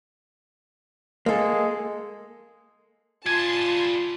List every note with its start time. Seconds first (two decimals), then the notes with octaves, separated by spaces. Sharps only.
1.26 G#3 A#3 A4
3.26 G3 F4 G#5 A5 C6 G#6